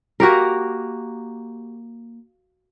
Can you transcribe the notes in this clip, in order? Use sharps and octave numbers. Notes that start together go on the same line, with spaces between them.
A#3 F#4 G4 A#4